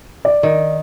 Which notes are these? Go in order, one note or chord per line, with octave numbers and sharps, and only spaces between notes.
D5
D#3